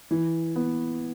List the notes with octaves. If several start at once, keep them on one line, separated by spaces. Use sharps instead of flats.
E3
B3